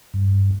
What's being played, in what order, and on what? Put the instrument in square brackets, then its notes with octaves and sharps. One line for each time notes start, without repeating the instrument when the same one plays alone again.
[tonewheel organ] G2